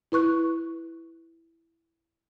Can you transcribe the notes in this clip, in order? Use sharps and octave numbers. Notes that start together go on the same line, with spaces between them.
E4 B4 C#6 F#6